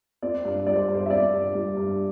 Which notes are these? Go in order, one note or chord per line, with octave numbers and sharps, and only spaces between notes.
C4 D5
G2
G3 D5
C5
G2
C5
E5
C4 D5
G2
G3
G2